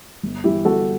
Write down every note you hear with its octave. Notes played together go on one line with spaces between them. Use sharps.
G1
G2 E3 E4 G4
G1 F#4 A4